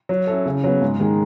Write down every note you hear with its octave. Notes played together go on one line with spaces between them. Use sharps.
F#3
C#4 E4 A4
C#3
F#3 B3
G#2
D#3 G#3